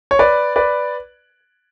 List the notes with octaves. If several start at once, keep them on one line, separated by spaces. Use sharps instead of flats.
C#5
B4 D5
B4 D5